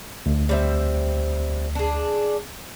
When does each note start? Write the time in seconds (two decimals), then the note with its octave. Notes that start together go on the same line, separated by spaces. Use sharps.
0.26 D2
0.49 G3 C4 E5
1.75 D4 G#4